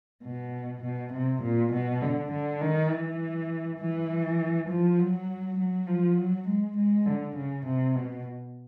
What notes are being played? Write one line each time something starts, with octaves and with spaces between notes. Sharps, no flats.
B2
B2
C3
A#2
B2
D3
D3
D#3
E3
E3
F3
F#3
F#3
F3
F#3
G#3
G#3
D3
C#3
C3
B2